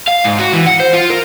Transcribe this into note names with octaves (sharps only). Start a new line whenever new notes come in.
F5
G#2
F#4
E3
F#5
C5
F4
A#4